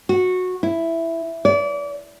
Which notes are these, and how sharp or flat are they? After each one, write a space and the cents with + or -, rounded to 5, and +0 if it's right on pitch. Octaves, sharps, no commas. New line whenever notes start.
F#4 -15
E4 +5
D5 -30